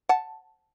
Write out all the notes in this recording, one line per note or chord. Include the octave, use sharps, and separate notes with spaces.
F#5 A5